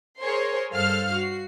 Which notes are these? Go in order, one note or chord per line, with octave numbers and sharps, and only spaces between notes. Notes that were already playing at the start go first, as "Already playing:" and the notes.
G#4 A#4 C5 C#5 C6
G2 A4 C5 F5 F6 C7
F#4 C7